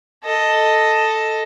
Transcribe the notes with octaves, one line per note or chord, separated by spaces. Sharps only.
A4 D#5